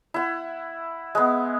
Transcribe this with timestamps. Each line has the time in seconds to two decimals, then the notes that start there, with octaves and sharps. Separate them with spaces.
0.14 E4 F#5
1.15 G#3 B3